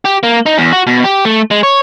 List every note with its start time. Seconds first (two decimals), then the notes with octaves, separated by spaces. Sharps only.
0.05 G4
0.23 A#3
0.46 D#4
0.58 E2
0.72 F#4
0.87 B2
1.04 G4
1.25 A3
1.51 G#3
1.63 C#5